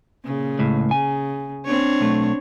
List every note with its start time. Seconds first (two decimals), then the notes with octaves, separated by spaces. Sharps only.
0.24 A#2 C#3
0.59 C#2 A2
0.91 C#3 G#5
1.65 C4 D4 C#5
2.01 B1 A3